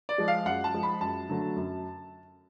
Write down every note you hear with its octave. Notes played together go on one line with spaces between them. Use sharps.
D5
F3 G#3
F5
F#2 F#5
A5
F3 G#3
B5
F#2 A5
D3 F#3 A3
F#2